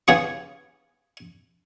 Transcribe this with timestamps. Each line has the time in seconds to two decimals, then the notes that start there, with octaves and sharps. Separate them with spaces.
0.08 C#3 B3 G#4 C#6